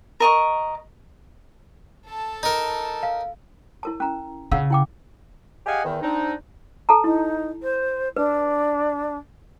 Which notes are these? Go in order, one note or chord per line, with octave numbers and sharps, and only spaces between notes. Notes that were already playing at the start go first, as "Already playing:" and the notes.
A#4 D#5 C#6
A4 A5
D#4 A#4
F5
E4 A#4 A5
C#4 A#5
C#3 F5 F#5 E6
E4 G5 D6
G4 G#4 D#5 F5 F#5 G#5
E2 D#3
C4 D4 D#4
A4 A5 A#5
D#4 E4
C5
D4 B4